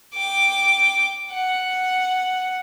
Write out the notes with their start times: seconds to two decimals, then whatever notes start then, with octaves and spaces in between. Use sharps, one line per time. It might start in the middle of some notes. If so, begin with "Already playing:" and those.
0.14 G5 D6
1.32 F#5